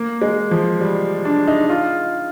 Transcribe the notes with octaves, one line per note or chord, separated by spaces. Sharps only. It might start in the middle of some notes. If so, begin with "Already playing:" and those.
Already playing: A#3
G#3
F3
G3
D4
D#4
F4